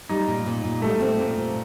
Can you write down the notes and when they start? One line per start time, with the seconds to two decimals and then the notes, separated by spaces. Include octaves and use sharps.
0.09 G3 D#4
0.28 A#2
0.46 A#2
0.64 A#2
0.82 G3 A3
1.00 C4
1.19 A#2
1.37 A#2